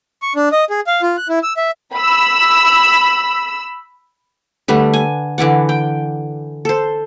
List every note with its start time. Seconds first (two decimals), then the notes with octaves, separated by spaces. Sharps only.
0.22 C#6
0.36 D4
0.52 D#5
0.70 G#4
0.87 F5
1.02 F4
1.17 F#6
1.29 E4
1.43 E6
1.57 E5
1.94 B5 E6
4.68 D3 G3 A3 B4
4.94 G#5
5.38 D3 E3 D5 F#5
5.69 G5
6.65 A4 C5